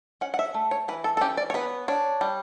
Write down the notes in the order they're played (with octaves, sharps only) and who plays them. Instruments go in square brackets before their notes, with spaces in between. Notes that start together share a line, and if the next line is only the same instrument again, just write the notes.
[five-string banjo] C#4 F#5
F#5
E5
A3
C#5
E3 B4
A4
A4
C#4 G4
D5
C#5
B3 B4
D4 C#5
G3